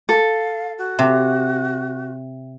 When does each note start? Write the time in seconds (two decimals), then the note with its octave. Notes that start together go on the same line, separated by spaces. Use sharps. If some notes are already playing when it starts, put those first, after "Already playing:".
0.09 A4 F5
0.78 F#4
0.99 C3 E5 G5